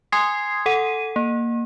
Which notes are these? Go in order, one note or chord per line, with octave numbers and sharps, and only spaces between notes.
G#5 C6 D#6 G#6 C7
A4 F#5 D#7
A#3